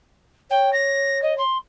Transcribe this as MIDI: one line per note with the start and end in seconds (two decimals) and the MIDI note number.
0.50 1.42 73
0.50 0.70 79
0.73 1.20 94
1.22 1.36 75
1.38 1.57 84